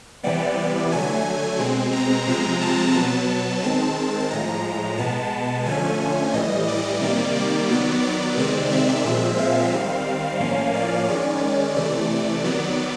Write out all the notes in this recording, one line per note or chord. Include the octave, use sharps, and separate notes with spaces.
C3 E3 G3 B3 D5
D3 F#3 A3 G#5
B2 G#3 C4
A#5
C3 F3 G#3 C4
A5
B2 F#3 B3 A5
D#3 G#3 C4
A2 F3 G#3 A#5
B2 G#3 B3 A5
D3 F3 A3 C#4 G#5
A2 E3 G3 D#5
D5
C3 D#3 G3 A#3
D5
D#3 F#3 B3
D5
C3 D#3 G#3 C4
E5
A#2 F3 G#3 C4
F5
D#3 G3 C4
A2 F3 A#3 C#4
D5
D#3 G#3 C#4 D5
C3 E3 A3 D5
D#3 F#3 B3